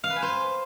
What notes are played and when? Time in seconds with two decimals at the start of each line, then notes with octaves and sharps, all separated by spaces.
0.04 F5
0.10 B4
0.16 G#5
0.22 C5